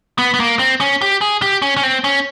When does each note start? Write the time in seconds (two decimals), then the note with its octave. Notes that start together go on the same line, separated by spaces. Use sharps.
0.18 B3
0.34 B3
0.40 A#3
0.59 C4
0.80 C#4
1.01 G4
1.21 G#4
1.42 G4
1.62 C#4
1.77 C#4
1.83 C4
2.04 C#4